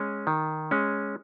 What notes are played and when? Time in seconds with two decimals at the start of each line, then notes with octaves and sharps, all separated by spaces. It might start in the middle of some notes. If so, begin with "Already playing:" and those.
Already playing: G#3 C#4
0.27 D#3
0.71 G#3 C#4